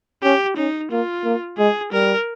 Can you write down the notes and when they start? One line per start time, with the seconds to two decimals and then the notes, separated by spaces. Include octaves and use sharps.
0.23 C#4 G4
0.57 C#4 D#4
0.91 A#3 F4
1.25 A#3
1.58 G#3 G#4
1.93 G3 A#4